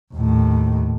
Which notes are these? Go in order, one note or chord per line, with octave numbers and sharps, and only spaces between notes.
D#2 A2